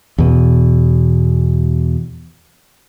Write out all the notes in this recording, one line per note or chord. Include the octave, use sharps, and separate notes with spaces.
E2 B2